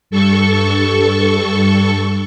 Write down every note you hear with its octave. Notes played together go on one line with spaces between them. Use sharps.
G2 A4 C#6